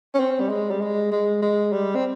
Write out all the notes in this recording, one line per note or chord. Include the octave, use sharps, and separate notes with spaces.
C#4
C4
G3
G#3
G3
G#3
G#3
G#3
G3
C4